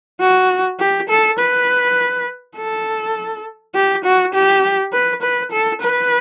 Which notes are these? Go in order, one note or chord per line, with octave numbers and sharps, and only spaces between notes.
F#4
G4
A4
B4
A4
G4
F#4
G4
B4
B4
A4
B4